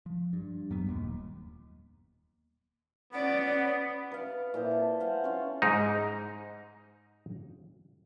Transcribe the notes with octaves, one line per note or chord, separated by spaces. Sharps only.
F3
G2
F#2 F#3 G3 B3
D#1 D#2 A#2
B3 C#4 D5 F#5
B4 F5
A#2 E4 C5
A4
G#4 C5 F5 F#5
C#4 F4
G#2 D#4